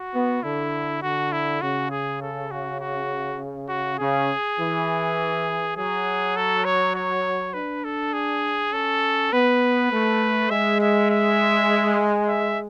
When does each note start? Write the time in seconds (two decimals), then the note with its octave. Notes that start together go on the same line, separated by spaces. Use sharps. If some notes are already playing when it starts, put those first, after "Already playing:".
Already playing: F#4
0.13 B3
0.42 D3 E4
1.02 D3 F#4
1.32 E4
1.61 C#3 F#4
1.91 G#4
2.21 A4
2.51 F#4
2.80 F#4
3.68 F#4
3.99 C#3 G#4
4.58 E3
5.76 F#3 G#4
6.36 A4
6.65 C#5
6.95 C#5
7.53 D4 B4
7.84 A4
8.13 G#4
8.72 C#4 A4
9.32 B3 B4
9.92 A3
10.50 G#3 E5
10.80 E5
11.10 E5
12.28 E5